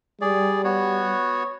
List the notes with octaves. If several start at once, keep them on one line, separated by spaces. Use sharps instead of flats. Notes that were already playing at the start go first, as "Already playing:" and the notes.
G3 G#4 D5
B3 F#4 C#5